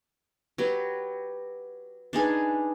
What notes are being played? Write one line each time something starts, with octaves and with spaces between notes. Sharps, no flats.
F#3 G4 B4
D4 D#4 G#4 B4